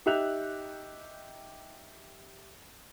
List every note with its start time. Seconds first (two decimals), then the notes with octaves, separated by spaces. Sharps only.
0.06 D#4 G4 E5 F#6 F7